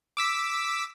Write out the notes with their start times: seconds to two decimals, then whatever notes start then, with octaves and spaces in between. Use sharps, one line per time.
0.17 D6 E6 B6